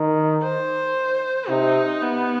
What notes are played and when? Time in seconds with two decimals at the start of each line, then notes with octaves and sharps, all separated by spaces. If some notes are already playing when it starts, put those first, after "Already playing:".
Already playing: D#3
0.43 C5
1.49 C3 D#4
2.02 B3